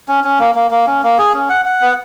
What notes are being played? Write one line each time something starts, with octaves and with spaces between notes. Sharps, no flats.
C#4
C#4
A#3
A#3
A#3
C#4
A#3
G#4
C#4
F#5
F#5
B3